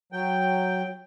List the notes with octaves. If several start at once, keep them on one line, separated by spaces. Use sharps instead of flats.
F#3 G5